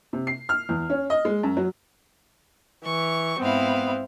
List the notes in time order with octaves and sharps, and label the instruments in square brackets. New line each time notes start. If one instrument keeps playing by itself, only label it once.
[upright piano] C3
C7
F6
E2
C#4
D#5
G#3
F#2
F#3
[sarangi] E3 [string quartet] C#6
[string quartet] G#2 E4 F5 [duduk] B3 [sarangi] C4